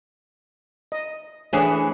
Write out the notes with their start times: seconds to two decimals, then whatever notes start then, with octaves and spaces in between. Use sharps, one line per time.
0.92 D#5
1.53 E3 A3 C#4 D4 G#4 F#5